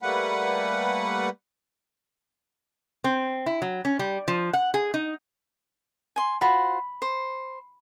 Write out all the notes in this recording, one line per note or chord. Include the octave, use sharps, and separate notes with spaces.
G3 A3 A#3 B4 F#5
C4
E4
F#3
C#4
G3
F3
F#5
G#4
D#4
G#5 C6
F4 F#4 C5 B5
C5